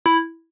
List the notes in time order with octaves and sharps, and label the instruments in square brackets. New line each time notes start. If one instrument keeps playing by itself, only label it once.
[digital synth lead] E4